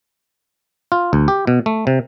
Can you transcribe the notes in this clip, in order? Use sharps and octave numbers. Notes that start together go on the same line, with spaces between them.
F4
D2
G4
B2
A3
C3